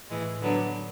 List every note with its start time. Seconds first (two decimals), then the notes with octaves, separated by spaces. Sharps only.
0.10 A2 E3 G#3
0.41 D3 F#3 B3 D4